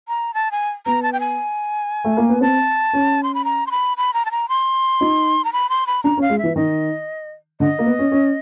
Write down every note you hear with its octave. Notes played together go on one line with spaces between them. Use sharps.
A#5
A5
G#5
B3 A#5
A5
G5
G#5
A3
A#3
B3
C4 A5
C#4
C6
B5
A#5
C6
B5
B5
A#5
A5
A#5
C6
D#4
A#5
B5
C6
B5
D4 A#5
C#4
F5
G#3
E5
E3
D#3 D#5
D3 D#5
A#3
B3
C#4
C#4